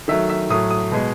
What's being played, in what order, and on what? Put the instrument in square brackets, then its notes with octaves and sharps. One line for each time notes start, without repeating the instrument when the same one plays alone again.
[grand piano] D#3 F#3 A3 E5
E5
A2 F#3 A3 D#6
D#6
B2 G#3